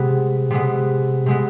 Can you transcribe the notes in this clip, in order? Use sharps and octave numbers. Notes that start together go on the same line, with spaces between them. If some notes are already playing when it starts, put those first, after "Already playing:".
Already playing: C3 G#3 B3
C3 G#3 B3
C3 G#3 B3